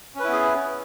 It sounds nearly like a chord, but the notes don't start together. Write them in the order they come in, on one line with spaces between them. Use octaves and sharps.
C#4 B4 E4 B3 G#4